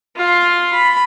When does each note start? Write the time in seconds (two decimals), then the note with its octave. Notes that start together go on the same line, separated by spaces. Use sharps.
0.17 F4 C6
0.74 B5